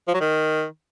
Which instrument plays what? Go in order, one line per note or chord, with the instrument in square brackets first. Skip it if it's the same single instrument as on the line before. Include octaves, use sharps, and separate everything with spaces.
[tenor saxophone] F3
F#3
D#3